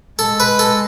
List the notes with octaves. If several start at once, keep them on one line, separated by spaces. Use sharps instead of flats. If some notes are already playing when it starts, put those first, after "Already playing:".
G#3 A4
B4
A4